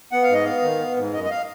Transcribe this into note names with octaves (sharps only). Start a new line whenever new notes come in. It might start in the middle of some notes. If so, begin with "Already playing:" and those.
B3 F#5
F5
G#2 D#5
B3 F5
D#3
B3
G#2
F#2 D#5
D#5
F5